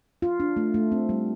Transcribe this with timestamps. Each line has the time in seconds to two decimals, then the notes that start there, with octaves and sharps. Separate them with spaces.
0.22 F4
0.40 D4
0.57 A3
0.74 A3
0.92 C4
1.09 G3